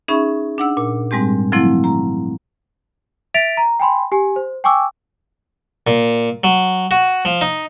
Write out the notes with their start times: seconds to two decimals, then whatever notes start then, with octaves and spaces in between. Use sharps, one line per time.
0.08 C#4 D#4 G#4 E5 B5 C#6
0.58 D4 F#5 E6
0.77 A#2
1.11 G#2 G3 G#3 C4 G4
1.52 D3 F3 F#3 A3 C4 E4
1.84 A#5
3.34 E5 A6 B6 D7 F7
3.57 A#5
3.80 G5 G#5 B5 C6
4.12 G4 G#5
4.36 C5
4.64 G5 G#5 C#6 D6 E6
5.87 A#2
6.44 F#3
6.91 F#4
7.25 F3
7.41 D#4